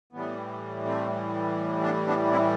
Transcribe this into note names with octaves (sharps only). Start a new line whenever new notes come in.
A2 E3 G3 B3
A3 C4
B3 D4
B3 D4
C4 E4